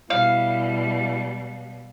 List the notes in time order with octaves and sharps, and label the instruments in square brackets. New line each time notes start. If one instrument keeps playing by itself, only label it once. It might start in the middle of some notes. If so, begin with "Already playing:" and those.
[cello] B2 G3 [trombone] E4 [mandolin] F5